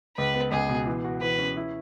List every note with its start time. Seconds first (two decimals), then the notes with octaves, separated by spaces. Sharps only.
0.17 C#2 B4
0.34 B3
0.52 C#2 G#4
0.69 B2
0.86 E3
1.05 F#4
1.22 E3 B4
1.38 C#4
1.57 E4